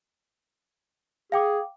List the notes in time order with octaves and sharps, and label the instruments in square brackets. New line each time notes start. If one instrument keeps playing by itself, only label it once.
[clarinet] G#4 [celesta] F5 G5 D6